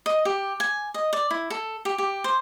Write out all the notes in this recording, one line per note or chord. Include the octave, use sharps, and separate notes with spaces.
D#5
G4
G#5
D#5
D5
E4
A4
G4
G4
C5